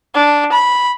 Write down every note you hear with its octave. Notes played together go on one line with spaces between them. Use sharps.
D4
B5